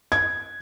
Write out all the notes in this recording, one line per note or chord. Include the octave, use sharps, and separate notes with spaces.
G#6